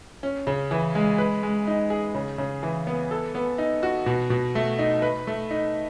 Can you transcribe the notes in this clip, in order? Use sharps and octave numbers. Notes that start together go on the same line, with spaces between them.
C#4
C#3
E3
G#3
B4
G#3
D#4
G#4
C#3
C#3
E3
B3
A4
B3
D#4
F#4
B2
B2
A3
D#4
B4
A3
D#4